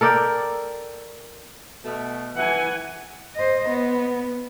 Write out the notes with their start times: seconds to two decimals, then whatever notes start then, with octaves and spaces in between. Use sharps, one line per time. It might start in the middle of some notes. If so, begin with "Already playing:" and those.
0.01 A4 A#4 D5 G5
1.85 B2 A3
2.36 E3 F#5 G#5
3.35 C5 D#5
3.69 B3